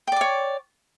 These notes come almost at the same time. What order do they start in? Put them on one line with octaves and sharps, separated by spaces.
G5 D5 D6 C#5